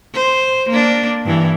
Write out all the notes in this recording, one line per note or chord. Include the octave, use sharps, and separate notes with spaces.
C5
A#3 D4
G2 E3